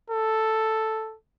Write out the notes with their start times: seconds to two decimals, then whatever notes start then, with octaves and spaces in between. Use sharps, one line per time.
0.10 A4